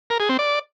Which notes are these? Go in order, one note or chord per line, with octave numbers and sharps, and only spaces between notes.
A#4
G#4
C4
D5